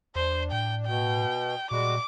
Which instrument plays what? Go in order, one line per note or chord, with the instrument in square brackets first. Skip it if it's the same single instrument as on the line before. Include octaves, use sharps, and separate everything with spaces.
[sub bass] E2 [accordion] D4 [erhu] C5
[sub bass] A2 [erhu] G5
[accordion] B2 [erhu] G5
[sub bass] A#2 [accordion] G3 G#3 F#4 [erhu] D6